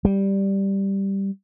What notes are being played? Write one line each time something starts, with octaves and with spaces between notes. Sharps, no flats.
G3